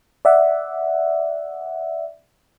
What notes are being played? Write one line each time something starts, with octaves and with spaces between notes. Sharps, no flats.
D5 E5 F#5